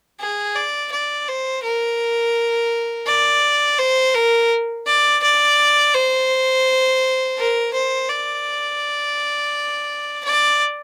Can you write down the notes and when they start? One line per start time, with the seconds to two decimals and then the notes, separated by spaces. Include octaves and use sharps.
0.20 G#4
0.56 D5
0.92 D5
1.28 C5
1.63 A#4
3.07 D5
3.79 C5
4.14 A#4
4.86 D5
5.22 D5
5.94 C5
7.38 A#4
7.73 C5
8.09 D5
10.24 D5